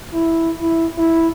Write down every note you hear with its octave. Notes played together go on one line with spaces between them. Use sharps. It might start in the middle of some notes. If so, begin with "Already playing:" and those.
E4
E4
E4